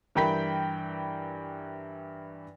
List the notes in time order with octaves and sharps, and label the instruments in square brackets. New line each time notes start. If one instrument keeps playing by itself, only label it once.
[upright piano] G2 E3 A#4 G5 B5 B6